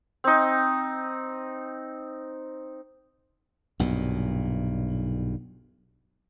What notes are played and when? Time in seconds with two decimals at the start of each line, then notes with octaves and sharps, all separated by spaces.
0.24 C4 D#4
3.79 B1 G2 A#2